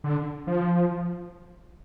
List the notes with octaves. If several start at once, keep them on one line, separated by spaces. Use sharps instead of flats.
D3
F3